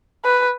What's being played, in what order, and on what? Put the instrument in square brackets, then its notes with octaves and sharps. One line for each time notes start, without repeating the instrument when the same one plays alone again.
[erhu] B4